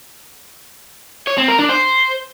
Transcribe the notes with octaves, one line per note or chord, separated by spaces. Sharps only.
C#5
C4
A#4
D4
C5